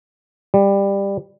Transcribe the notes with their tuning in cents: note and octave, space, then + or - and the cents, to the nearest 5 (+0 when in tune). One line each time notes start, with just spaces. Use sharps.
G3 +15